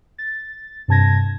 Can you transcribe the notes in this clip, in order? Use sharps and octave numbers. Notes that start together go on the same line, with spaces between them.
A6
G2 C3 A5 G#6 A#6